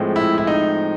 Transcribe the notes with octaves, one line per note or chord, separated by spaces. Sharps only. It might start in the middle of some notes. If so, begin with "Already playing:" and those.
Already playing: A2 F3 G#3 C4
E4
E4
D#4